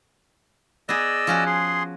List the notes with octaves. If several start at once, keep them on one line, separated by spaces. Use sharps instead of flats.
B3 G#4 D5 D#5 E6
F3 C#4 F#4
G#4 C6